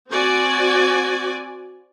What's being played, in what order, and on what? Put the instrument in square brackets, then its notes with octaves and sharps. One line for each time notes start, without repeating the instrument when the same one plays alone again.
[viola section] C4 F#4 D5 G#5